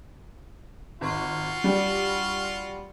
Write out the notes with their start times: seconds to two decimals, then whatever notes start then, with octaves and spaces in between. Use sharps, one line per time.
1.01 G#1 F4 F#4
1.64 G3 D4 G4